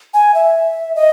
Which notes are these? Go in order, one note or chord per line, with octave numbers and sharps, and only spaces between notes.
G#5
E5
D#5